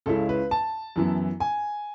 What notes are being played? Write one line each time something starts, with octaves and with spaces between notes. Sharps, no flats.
C#2 C#3 G#3 C#4 E4 A4
B4
A5
F#2 E3 B3 E4
G#5